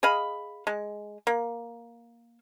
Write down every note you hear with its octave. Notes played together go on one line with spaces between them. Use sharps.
G#4 D#5 F5 B5
G#3
A#3